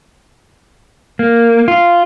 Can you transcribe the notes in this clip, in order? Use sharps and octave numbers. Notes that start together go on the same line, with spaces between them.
A#3
F4